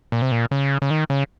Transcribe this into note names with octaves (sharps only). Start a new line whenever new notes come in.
A#2
C3
A#2
C#3
C#3
D#3
C#3